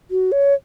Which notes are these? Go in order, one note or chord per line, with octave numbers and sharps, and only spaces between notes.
F#4
C#5